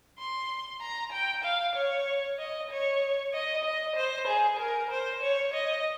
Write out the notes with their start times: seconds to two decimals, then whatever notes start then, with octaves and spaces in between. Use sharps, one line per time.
0.18 C6
0.81 A#5
1.12 G5
1.44 F5
1.76 C#5
2.39 D#5
2.70 C#5
3.34 D#5
3.64 D#5
3.96 C5
4.27 G#4
4.59 A#4
4.90 C5
5.23 C#5
5.54 D#5